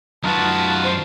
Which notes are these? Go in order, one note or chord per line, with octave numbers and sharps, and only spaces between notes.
F#2 D#4 F4 F#4 B4 A5
C5